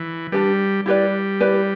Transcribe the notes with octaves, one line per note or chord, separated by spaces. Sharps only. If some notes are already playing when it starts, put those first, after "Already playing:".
Already playing: E3
G3 D4 G4 B4
G3 E4 G4 B4 D5
E4 G4 B4 D5